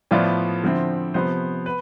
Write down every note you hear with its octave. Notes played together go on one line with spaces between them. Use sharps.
A2 F3 B3 F4 D5
D3 F3 C4 E4
C3 F3 B3 C5
B4